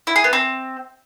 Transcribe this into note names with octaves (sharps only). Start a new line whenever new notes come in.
E4
G#4
B3
C4